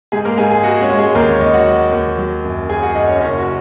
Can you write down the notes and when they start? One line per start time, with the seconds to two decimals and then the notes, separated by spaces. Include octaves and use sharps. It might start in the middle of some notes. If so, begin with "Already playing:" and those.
0.12 G#2 G#4
0.25 A#3 A#4
0.38 G#2 G#4 G#5
0.51 G#4 G#5
0.63 G#3 F#4 F#5
0.81 C#4 C#5
0.89 G#3
0.98 G#4
1.15 D#2 A#3 A#4
1.28 C#4 C#5
1.40 D#2 D#4 D#5
1.54 F#4 F#5
1.67 F#3
1.92 D#2
2.18 F#3
2.44 F#2
2.69 F#3 G#4 G#5
2.82 F#4 F#5
2.95 F#2 D#4 D#5
3.08 C#4 C#5
3.21 F#1 C#4 C#5
3.39 F#4